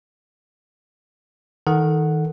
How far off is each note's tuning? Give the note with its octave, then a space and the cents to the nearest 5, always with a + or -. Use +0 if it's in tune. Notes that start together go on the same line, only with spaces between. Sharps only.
D#3 +30 A4 +0 F#5 +0